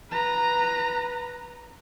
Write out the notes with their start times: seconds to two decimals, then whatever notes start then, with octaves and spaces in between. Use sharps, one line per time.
0.11 B4 A#5